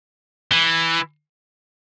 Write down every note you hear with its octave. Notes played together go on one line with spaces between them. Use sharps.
E3